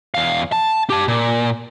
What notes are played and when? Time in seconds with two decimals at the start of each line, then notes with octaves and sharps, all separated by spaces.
0.14 E2 F5
0.52 A5
0.90 G4 A5
1.08 A#2